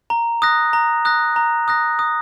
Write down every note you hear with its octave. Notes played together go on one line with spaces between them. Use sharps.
A#5
D#6 F#6 A#6
A#5
D#6 F#6 A#6
A#5
D#6 F#6 A#6
D#6